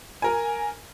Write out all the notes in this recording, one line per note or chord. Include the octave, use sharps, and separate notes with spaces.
A#4 G#5